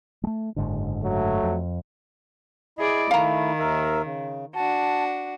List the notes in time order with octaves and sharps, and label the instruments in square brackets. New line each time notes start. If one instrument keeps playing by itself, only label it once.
[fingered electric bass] G#3 A3
F#1 G#2 D3
[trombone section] F#3 A3
[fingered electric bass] F2
[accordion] E4 D#5 [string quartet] G#4 D5
[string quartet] D#3 [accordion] A3 E4 [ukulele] F5 A#5
[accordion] D#2 A#4 E5
C#3
[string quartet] D4 F#4 [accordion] A5